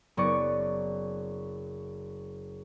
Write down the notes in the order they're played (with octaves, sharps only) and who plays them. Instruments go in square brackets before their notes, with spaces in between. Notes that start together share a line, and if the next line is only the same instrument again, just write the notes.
[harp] F#1 B3 D5 C#6